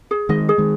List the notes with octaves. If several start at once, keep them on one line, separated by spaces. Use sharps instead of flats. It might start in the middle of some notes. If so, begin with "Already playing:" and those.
G#4
D#3 G#3 D#5
G#4
D#3 G#3